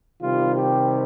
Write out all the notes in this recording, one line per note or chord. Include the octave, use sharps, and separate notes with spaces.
C3 D#3 G3 F4
G4